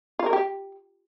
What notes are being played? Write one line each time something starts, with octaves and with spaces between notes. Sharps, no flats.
F4
A#4
G4